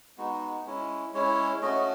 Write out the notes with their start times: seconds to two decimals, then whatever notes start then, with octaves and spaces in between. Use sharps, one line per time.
0.18 G#3 B3 D#4 F#4
0.65 G#3 C#4 E4
1.14 G#3 C#4 E4 C#5
1.62 A3 C#4 F#4 D#5